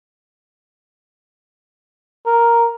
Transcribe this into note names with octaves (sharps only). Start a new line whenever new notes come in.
A#4